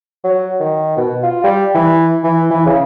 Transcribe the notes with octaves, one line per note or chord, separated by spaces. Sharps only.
F#3
D#3
B2
F4
G3
E3
E3
E3
C#3